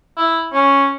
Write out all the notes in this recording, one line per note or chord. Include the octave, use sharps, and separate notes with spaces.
E4
C#4